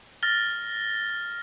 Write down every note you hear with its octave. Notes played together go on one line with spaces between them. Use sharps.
F6 A6 A#6 G7